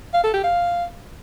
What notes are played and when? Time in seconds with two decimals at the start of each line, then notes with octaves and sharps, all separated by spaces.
0.14 F5
0.24 A4
0.34 G4
0.44 F5